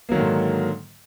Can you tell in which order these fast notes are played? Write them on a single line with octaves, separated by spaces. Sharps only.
A#3 F#3 D#3 D3 G#2